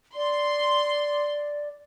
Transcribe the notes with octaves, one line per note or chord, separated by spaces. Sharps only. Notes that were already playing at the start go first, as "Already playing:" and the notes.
D5 C6